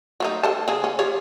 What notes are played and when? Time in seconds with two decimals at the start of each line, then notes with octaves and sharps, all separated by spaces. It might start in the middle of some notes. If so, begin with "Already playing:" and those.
0.20 F#3 A3 D#4
0.43 A4 C5 A5
0.68 C#3 G#4
0.84 C#4
0.99 F3 G4 C#5